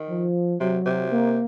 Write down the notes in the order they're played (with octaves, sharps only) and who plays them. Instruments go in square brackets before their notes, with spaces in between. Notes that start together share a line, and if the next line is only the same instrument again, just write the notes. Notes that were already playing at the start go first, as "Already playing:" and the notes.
Already playing: [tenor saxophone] D#3
[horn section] F3
[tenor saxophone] C3 [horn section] F#3
[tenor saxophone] C3
[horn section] A#3